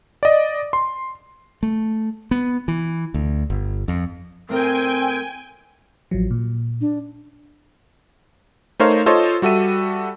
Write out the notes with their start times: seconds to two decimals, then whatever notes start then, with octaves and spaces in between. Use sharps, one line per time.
0.23 D5 D#5
0.73 C6
1.63 A3
2.31 B3
2.68 E3
3.14 D2
3.50 G1
3.88 F2
4.49 A2 C4 A#4 G5 G#5 D#6
6.11 A1 F3 F#3
6.31 A#2
6.81 D4
8.80 A3 D#4 A#4 C5 C#5 F5
9.06 F4 A4 C5 C#5 D#5
9.42 G3 F#4 A4 E5 D#7